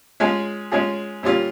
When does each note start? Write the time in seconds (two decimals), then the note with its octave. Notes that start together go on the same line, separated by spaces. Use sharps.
0.20 G#3 C#4 F4 G#4
0.72 G#3 C#4 F4 G#4
1.23 A#2 G3 C#4 F4